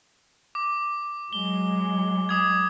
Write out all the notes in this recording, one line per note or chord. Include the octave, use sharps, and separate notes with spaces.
D6
F#3 G#3 G7
D6 D#6 G#6